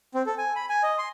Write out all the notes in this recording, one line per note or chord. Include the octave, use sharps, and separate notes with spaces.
C4
A4
G#5
B5
G#5
D#5
C6